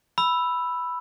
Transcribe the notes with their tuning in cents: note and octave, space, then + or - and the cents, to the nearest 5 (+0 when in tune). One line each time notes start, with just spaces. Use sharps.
B5 +0 E6 +5